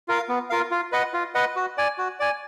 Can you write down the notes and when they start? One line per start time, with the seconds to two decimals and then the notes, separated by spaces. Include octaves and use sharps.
0.08 F4 A#4 F5
0.29 B3
0.50 F4 A#4 F5
0.71 F4
0.92 B4 D#5 F#5
1.14 F4
1.35 B4 D#5 F#5
1.56 F#4
1.78 D5 G#5
1.98 F#4
2.20 D5 G#5